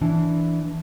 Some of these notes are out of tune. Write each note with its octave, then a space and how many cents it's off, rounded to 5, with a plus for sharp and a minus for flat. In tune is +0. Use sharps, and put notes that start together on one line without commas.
E3 +0 D4 +0